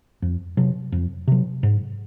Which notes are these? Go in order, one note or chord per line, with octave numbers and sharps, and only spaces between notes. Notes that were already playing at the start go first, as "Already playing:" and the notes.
F2
C3 F#3
F2
C3 F#3
G#2